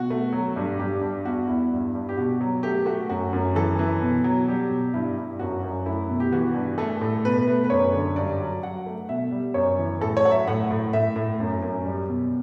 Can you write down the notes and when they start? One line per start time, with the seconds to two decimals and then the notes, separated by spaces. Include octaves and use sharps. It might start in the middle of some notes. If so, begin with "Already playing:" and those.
Already playing: B2 F#4
0.10 A3
0.33 F#3
0.56 G2
0.80 G2 G4
1.01 G2
1.25 E2 F#4
1.48 E2 E4
1.71 G2
1.95 G2
2.09 G4
2.17 B2 F#4
2.41 F#3
2.63 A3 G4
2.86 A3 F#4
3.09 F#2 F#4
3.33 F#2
3.55 E3 A4
3.79 E3
4.02 B2
4.24 F#3
4.48 G3 G4
4.70 B2
4.94 G2 E4
5.18 G2
5.39 F#2 F#4
5.63 F#2
5.86 A3 E4
6.09 B2
6.20 G4
6.32 E3 F#4
6.55 G2
6.78 A3 A4
7.01 A2
7.25 B2 B4
7.48 A3
7.64 B4
7.70 F#2 C#5
7.93 D3
8.16 G2 D5
8.40 F#3
8.62 F#3 F#5
8.86 A3
9.09 B2 E5
9.31 G3
9.54 F#2 C#5
9.78 E3
10.01 A2 A4
10.17 C#5
10.24 F#3 F#5
10.31 E5
10.47 A2 F#5
10.71 A2
10.93 A2 E5
11.16 A2
11.40 F#2
11.62 F#2
11.85 G3
12.08 B2